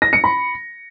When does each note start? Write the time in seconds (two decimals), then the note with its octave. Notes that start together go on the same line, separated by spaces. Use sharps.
0.02 A#6
0.13 C#7
0.24 B5